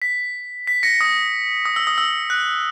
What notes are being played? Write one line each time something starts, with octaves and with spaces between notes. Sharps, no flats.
B6
B6
A#6 C#7
D#6
D#6
E6
D#6
E6
F#6